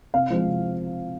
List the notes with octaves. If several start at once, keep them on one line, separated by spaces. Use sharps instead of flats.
C3 F5
F3 G#3 C4
C3